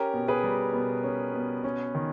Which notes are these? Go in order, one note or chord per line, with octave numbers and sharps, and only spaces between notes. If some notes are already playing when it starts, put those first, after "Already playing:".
Already playing: C#4 G4 A#4
B2
G#4 B4
G3
B2
C#4
B2
C#4
D#3